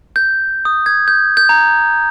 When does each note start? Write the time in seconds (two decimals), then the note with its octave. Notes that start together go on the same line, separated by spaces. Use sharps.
0.16 G6
0.65 D#6
0.86 G#6
1.08 G6
1.37 G6
1.49 A#5